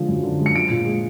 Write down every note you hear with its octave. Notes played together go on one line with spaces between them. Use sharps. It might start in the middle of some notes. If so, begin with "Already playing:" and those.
Already playing: D3 F3 G#3
F#2
D3
G#3
C#7
F3 D7
A#2
G#3